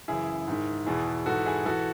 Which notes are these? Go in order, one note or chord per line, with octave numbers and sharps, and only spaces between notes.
F#2 C#3 E3 E4 G#4
G#2 D#3
E2 B2 E4 G#4
G#2 E3 F#4 A4
E4 G#4
E3 F#4 A4